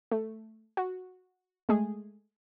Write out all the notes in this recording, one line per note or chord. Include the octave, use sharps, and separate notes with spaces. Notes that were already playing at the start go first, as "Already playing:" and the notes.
A3
F#4
G#3 A3 G#4